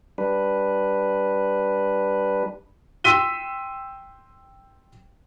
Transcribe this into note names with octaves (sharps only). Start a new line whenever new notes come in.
G3 D4 B4
G5 C6 E6 B6 D#7 G7